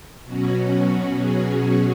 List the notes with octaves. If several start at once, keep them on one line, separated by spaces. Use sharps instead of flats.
B2 F#3 C#4 F#4
G#4
G#4